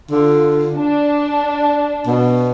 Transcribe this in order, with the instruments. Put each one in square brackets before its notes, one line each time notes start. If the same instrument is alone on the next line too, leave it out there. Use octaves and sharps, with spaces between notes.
[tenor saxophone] D3 [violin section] F4
[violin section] D4
[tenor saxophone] B2